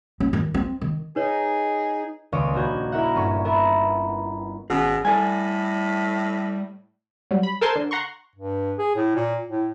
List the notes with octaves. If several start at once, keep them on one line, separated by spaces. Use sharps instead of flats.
C#4
D#3
C4
D#3
D#4 G#4 B4 C#5
D#1 C#2 C#5 D6 D#6
A#1 D#3 F#4 G6 G#6
E4 A#4 E5 F#5
G1 C#4 C#6
B3 A#4 E5
G#1 B2 C#4 G#4
A2 G3 A4 D5 G#5
F#3 G3
B5
A4 A#4 C5 G#5 A5 C6
D3
F#5 A#5 C6 C#6
G2
G#4
A2
A#2
A2